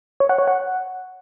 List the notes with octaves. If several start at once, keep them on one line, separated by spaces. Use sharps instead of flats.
C#5
F#5
C#5
F#5